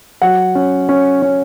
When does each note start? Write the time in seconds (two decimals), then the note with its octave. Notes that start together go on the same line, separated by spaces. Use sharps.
0.22 F#3 F#5
0.55 C#4
0.89 C#4
1.22 C#4